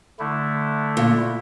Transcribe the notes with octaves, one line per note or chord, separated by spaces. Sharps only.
D3 A3 E4
A#2